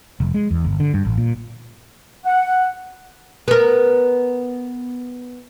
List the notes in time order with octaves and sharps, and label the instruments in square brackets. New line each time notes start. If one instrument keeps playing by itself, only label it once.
[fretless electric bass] F1
G#3
E2
G1
D3
G2
A1
A#2
[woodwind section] F#5
[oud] B3 A#4